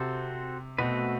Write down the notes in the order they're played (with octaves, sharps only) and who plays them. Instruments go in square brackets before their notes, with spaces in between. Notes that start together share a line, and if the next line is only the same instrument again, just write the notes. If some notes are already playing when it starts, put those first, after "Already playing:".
Already playing: [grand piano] C3 [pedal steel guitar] C4 F#4 A4 C5
[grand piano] B2 [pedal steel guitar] A3 C4 F#4 B4